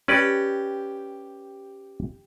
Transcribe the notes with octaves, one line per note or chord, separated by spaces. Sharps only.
C#4 G4 B4 D5